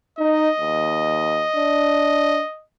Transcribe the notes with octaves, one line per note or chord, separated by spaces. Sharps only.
D#4 D#5
D#2
D4